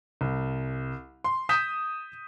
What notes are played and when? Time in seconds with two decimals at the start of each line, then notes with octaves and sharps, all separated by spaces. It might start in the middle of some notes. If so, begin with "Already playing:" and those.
0.21 C2
1.24 C6
1.49 D#6 G6 B6 E7